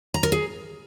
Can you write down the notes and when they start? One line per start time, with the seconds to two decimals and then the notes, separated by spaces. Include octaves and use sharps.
0.14 A#5
0.23 A#4
0.32 G#4